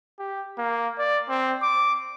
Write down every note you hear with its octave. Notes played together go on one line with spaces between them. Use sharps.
G4
A#3
D5
C4
D6